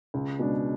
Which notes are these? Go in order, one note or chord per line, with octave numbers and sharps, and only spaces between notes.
C#2
B2 G#3 D4